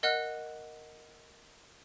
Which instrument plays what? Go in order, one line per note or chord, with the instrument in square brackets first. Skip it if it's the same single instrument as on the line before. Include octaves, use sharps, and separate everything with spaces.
[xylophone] A#4 D#5 F#5 F6 F#6